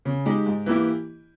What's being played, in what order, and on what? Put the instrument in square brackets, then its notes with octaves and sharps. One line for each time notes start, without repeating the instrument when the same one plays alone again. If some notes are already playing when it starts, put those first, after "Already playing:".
[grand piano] C#3
G#3 D#4 G4
G#2
E3 A#3 E4 G4